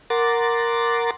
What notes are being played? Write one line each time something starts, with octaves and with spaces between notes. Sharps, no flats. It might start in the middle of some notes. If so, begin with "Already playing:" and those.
A#4 F#5 A#5 C6 D6 A6